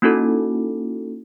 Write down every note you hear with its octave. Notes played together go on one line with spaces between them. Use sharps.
A#3 C#4 D#4 E4 F#4 A4